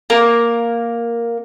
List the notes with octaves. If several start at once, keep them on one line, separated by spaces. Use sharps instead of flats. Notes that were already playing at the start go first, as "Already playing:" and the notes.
A#3 A#4